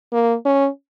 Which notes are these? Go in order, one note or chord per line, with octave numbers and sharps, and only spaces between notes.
A#3
C#4